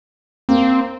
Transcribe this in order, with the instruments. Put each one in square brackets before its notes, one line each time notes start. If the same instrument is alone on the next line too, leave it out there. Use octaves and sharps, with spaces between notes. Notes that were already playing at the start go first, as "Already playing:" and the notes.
[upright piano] A#3 [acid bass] C4